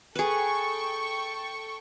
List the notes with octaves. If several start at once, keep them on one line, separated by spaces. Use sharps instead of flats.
G#4 A4 B4 G5 C#6